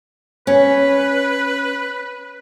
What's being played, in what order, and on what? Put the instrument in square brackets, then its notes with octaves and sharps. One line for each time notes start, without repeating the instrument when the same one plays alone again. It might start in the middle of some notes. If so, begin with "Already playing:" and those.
[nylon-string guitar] C#4 [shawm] B4